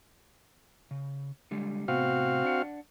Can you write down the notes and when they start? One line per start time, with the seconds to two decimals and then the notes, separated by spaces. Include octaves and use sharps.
0.91 C#3
1.51 D3 G3 G#3
1.88 A2 C3 B3 C4 F#4 F5
2.44 D4 F#5